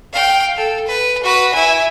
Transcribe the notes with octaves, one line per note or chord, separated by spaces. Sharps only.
F5 G5
A4
B4
F#4 B4
E4 G#5